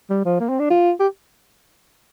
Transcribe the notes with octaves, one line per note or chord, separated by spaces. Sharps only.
G3
F3
A#3
C4
D4
F4
G4